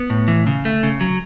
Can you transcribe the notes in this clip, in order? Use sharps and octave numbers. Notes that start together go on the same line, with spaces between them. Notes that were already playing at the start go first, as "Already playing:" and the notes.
Already playing: B3
A2
E3
C#3
A3
C#3
F#3